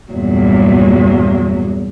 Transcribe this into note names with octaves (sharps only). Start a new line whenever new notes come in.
E2 G2 A#2 F#3